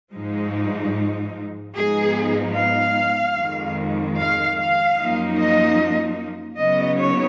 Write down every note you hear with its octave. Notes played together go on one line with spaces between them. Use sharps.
G#2 F3 G#3 D#4
G#2 F3 G#3 B3 D#4 G#4
F5
F2 D#3 G#3
F5
F5
F#2 F3 A#3 D#4
D#5
C#3 F#3 B3 D#4 D#5
C#5